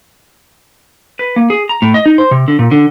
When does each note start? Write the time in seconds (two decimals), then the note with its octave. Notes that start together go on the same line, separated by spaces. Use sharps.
1.19 B4
1.36 A#3
1.50 G#4
1.69 A#5
1.82 A2
1.94 D#5
2.06 D#4
2.18 C5
2.31 C3
2.48 D3
2.59 A#2
2.71 D3